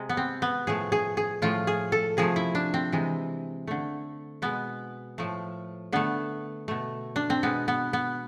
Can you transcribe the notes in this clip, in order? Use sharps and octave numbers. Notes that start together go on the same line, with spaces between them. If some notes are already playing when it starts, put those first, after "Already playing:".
Already playing: C3 G#3
B3
C4
B3
A2 F3 A3 G#4
G#4
G#4
A2 F3 A3 F4
G#4
A4
C3 F3 A3 G#4
E4
D4
C4
C3 E3 G#3
D3 A3
B2 G#3 B3
A2 F3 A3
D3 A3 B3
B2 A3
D4
C4
B2 G#3 B3
B3
B3